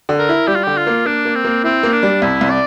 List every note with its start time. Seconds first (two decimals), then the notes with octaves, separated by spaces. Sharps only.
0.09 D3
0.19 A#4
0.29 E4
0.48 G3 G4
0.55 F4
0.63 D3 G4
0.77 F4
0.87 A#3
1.06 A#3 D4
1.25 A#3
1.35 C4
1.45 A#3
1.64 C4 E4
1.83 A#3
1.93 D4
2.03 G3
2.22 C2 E4
2.41 C2
2.50 D5